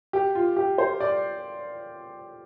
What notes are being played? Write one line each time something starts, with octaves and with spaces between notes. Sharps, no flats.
G4
F4
G4
C5
D5